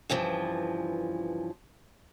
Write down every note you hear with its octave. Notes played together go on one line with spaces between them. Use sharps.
G2 C#3 E3 F3